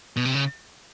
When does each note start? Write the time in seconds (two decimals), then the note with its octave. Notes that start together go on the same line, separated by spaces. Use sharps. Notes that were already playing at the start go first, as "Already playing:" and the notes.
0.17 B2
0.25 C3
0.34 C#3